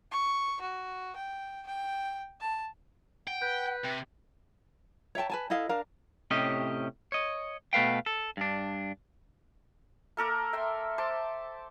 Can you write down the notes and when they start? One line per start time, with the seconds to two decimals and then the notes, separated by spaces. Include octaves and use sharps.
0.11 C#6
0.61 F#4
1.16 G5
1.67 G5
2.40 A5
3.27 F#5 G5
3.42 B4 G6
3.84 C3 G5
5.15 C#5 E5 G5 A5
5.30 B4 G#5 A5
5.50 E4 A4 D#5 F5
5.69 D4 A#4 F5
6.31 A2 C3 C#4 G4 D#5
7.12 C#5 D#5
7.73 B2 A3 B4 F5 G5
8.06 A4
8.37 G2 D4
10.17 A#3 A4 A#4 D6
10.53 E5 G5 C6
10.98 C5 A5 C6 D6